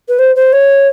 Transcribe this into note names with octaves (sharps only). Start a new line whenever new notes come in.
B4
C5
C5
C#5